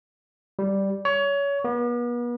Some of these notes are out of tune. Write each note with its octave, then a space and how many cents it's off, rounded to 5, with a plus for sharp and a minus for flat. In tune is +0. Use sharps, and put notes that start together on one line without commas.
G3 -5
C#5 +25
B3 -40